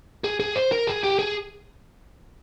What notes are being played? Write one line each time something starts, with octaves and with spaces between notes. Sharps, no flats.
G#4
G#4
C5
A#4
G#4
G4
G#4